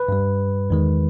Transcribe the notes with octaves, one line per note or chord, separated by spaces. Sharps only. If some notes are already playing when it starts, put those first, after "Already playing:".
Already playing: B4
G2 G3
E2 D#3 G#3